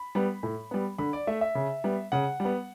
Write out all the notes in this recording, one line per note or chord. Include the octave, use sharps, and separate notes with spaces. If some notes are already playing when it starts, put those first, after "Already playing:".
Already playing: B5
G3 B3
A2
G3 B3
D3 B5
D5
A3 E5
E5
C#3
G3 B3
C#3 F#5
G3
B3